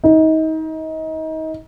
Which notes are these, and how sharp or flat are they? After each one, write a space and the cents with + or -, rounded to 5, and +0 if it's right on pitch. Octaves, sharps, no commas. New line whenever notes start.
D#4 +30